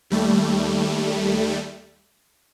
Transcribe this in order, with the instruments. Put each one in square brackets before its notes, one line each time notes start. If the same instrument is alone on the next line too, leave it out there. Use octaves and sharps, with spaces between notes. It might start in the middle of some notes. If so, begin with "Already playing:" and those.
[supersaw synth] D#2 G3 A3